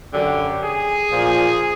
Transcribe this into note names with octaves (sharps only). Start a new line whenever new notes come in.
F#2 D3 F#3 G4
G#4
A#2 F3